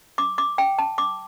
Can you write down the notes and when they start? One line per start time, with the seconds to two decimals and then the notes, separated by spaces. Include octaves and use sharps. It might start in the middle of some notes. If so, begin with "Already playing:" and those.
0.18 D6
0.38 D6
0.58 G5
0.78 A5
0.98 D6